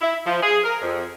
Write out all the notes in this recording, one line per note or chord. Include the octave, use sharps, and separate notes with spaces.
E4
F3
G#4
A#4
F2